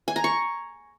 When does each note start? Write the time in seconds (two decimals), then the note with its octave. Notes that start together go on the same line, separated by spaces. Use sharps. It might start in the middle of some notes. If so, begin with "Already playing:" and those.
0.08 G#5
0.16 A#5
0.24 C#6